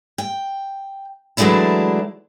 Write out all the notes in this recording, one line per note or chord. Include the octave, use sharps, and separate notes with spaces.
G5
E3 F#3 G#3 A3 D4 E4